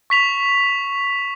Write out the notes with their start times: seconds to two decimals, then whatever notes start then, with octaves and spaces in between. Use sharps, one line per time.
0.10 C#6 B6 F7